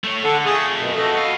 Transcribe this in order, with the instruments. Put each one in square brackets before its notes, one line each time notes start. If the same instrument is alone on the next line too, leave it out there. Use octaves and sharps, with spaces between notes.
[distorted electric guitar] A3 C#5
[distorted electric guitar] D3 [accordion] A4 F#5
[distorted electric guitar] F2 A3 [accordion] G#4 C#6 D#6
[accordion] F#2 B2
F#4 A4 D#5
[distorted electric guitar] B3 F5